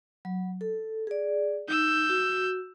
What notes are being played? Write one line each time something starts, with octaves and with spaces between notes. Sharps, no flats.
F#3
A4
G#4 D5
D#4 E6 G6
F#4